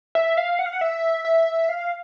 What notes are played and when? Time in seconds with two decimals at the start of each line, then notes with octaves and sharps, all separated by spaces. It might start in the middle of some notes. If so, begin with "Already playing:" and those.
0.15 E5
0.37 F5
0.59 F#5
0.66 F5
0.73 F#5
0.81 E5
1.25 E5
1.69 F5